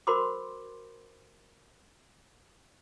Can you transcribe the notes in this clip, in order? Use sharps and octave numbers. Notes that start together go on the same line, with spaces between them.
F#4 A#4 C5 B5 C6 D6